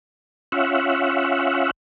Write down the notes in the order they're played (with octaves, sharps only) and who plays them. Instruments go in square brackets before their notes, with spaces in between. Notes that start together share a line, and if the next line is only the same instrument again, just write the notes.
[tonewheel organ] C#4 F4 E5 F#5